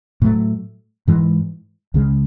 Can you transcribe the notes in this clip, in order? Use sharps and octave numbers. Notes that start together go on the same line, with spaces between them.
A2 F#3 A3
G#2 E3 G#3
C#2 C#3 G#3